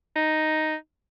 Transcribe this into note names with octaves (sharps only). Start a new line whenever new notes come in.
D#4